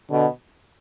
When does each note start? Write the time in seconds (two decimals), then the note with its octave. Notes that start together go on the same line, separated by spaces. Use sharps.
0.11 B2 D3